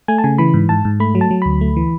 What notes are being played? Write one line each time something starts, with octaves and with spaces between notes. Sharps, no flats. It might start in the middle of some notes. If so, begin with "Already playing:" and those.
A3 G#5
A5
C#3 G#5
E3 B5
G#2
G#2 A5
G#2
A3 B5
F#3
A5
F#3
D2 B5
A3
E3